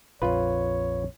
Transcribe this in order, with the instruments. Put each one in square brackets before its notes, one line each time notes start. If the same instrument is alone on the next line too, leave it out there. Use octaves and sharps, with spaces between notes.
[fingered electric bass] A#1 F2 [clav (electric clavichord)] F4 B4 [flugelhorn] C#5